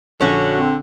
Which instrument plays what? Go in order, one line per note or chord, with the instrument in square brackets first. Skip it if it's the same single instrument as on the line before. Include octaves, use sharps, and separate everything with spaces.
[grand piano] A#1 [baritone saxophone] D3 [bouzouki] C#4 F#4
[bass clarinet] C4